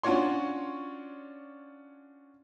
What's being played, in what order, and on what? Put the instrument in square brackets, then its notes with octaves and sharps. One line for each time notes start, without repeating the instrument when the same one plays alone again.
[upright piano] C#4 D4 F4 F#4 C#5 C6